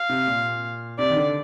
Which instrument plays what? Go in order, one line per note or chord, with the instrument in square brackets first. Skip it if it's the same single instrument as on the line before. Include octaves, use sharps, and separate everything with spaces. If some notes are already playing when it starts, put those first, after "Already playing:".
Already playing: [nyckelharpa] F5
[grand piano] C3
A#2
[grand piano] C3 [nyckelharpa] D5
[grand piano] D#3
D3